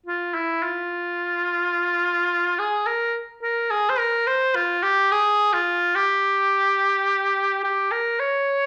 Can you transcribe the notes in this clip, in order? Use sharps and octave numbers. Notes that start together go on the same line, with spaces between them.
F4
E4
F4
G#4
A#4
A#4
G#4
C5
A#4
C5
F4
G4
G#4
F4
G4
G4
A#4
C#5